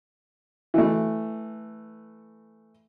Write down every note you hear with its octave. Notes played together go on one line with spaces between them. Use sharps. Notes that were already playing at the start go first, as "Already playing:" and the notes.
E3 A3